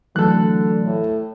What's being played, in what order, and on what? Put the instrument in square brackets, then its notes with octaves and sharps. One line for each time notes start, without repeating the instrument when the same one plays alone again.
[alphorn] D3 [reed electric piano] E3 F#3 A3 [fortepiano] A4 F#6
[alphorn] A2